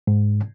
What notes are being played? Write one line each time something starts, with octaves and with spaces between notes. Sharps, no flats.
G#2